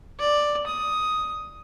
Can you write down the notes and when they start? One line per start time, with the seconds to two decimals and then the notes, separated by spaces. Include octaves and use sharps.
0.19 D5
0.67 D#6